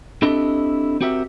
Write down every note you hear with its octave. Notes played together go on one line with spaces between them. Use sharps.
C4 D4 E4 G4 A4 D#5
C4 F#4 G4 A#4 D#5 E5